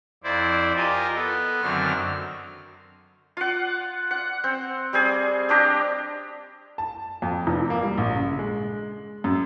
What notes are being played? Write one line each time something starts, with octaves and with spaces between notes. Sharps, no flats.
F2 E4 C5 D5
F4 G4 A#4 D#5 G#5
B3 A4
F#2 D3 D#3 F#3 C4 F6
F4 F#5
F#5
C4
G3 C4 G#4
C4 D4 G4 D#5
A5
F2
F1
A#3
G3
A#1
C#3
G#3
F#2